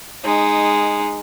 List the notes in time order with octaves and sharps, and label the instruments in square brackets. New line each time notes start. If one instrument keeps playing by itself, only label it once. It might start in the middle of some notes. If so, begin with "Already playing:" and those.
[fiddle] G#3 D#4